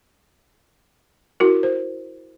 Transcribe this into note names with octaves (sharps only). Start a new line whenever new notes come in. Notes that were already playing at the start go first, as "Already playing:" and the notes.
E4 F#4 A#4
C5